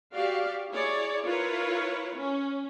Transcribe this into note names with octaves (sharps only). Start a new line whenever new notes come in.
F#4 G4 D5 F5
E4 G#4 C#5 D5
E4 F4 A#4 B4 C#5
C#4